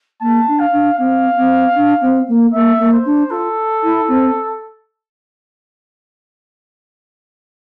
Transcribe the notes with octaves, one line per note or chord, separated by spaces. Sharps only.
A#3 A5
D4
F5
D4
C4 F5
C4
D4
C4
A#3
A#3 E5
A#3
C5
D4
F4 A4
E4
C4